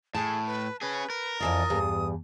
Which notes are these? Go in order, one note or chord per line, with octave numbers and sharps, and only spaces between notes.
A2 G#4 A5
B4
C#4 G#4 B4
A#4
F2 E3 D5 D#6
E2 G2